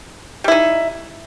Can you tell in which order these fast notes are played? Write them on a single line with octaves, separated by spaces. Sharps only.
G3 E4 D#4